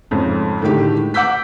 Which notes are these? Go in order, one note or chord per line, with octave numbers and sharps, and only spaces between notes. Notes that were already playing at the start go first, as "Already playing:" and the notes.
F2 G#2 C#3
A2 D3 D#3 G#3 G4
F#5 D6 E6 G6 B6